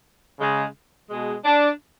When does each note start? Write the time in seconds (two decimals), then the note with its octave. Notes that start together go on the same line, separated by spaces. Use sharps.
0.39 C#3 G#3
1.10 B2 G#3
1.44 D4